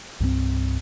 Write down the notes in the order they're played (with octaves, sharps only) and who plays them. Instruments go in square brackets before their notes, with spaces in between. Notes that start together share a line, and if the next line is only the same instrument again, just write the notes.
[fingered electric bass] C2 G2 F3 C4